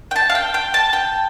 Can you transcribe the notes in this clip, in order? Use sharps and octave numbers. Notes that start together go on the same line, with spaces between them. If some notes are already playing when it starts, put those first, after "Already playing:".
G5
A5
F5
G5
G5
A5
G5